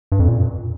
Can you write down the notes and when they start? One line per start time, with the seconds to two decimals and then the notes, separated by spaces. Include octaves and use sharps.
0.12 G2
0.19 F2
0.28 A#2